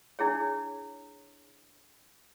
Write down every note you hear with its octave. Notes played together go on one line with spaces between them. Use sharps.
D4 E4 G#4 C#5